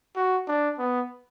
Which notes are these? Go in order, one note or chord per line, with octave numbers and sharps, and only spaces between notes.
F#4
D4
B3